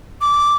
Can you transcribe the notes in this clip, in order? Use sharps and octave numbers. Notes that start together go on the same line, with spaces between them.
D6